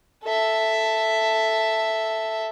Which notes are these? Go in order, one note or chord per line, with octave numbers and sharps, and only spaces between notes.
A4 E5